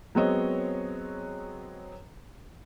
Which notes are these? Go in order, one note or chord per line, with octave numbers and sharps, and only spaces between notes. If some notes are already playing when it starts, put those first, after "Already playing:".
F#3 G#3 B3 C4 C#5 D#5